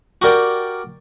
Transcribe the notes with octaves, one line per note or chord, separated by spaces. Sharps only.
F#4 G4 A#4 D5 G5